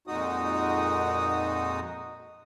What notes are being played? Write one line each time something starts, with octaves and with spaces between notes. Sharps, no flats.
F2 A#2 G#3 D#4 F#4 D#6